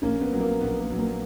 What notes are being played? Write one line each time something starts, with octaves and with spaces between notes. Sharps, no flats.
A#1 A#3 C#4
B3
A#2 F#3
A#3
A#1 B3
A#3
A#2 F#3
A#3